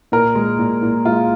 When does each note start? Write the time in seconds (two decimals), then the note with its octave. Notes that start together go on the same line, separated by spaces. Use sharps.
0.12 A#2 A#4
0.35 G#3
0.59 A#2
0.83 A#2
1.05 G#3 F4